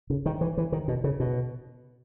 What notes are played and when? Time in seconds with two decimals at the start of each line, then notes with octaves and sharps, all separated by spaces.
0.10 C#3
0.26 D#3
0.41 E3
0.58 E3
0.72 D#3
0.88 B2
1.04 C#3
1.20 B2